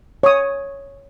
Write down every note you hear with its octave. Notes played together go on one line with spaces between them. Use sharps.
C#5 D#6